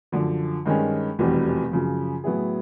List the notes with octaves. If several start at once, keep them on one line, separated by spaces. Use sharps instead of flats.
F#2 D3 F3
G2 D#3 G#3 C#4
F1 E2 B2 G3 C4
F#2 C#3 F3
A2 F#3 B3 E4 G#4